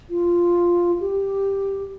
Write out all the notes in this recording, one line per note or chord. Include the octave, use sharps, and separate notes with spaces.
F4
G4